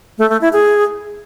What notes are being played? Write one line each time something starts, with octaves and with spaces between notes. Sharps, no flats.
A3
A3
E4
G#4